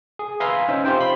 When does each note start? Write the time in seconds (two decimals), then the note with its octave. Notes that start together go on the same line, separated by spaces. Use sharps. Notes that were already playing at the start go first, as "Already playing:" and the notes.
0.19 G#4
0.40 B4 E5 F5 G#5 A#5 C6
0.69 C#4 D#4 C5 E5
0.85 C4 F4 G4 C5 G5
1.01 B5 C6 B6